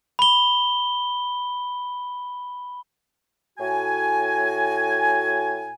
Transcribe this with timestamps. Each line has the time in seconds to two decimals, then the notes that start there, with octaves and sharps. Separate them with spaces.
0.19 B5 G7
3.59 A2 F#4 G#5